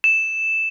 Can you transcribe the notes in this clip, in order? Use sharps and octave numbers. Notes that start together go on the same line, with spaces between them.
E7